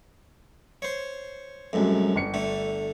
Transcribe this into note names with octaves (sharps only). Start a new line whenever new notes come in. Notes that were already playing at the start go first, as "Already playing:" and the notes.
C5 C#5
C2 F#2 F#3 G#3 A3
G1 C#7
D3 A3